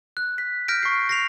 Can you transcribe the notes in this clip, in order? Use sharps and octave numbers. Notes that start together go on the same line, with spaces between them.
F#6
B6
F6 G6 A#6 B6 D7
C#6 C7
A#6 C7 F7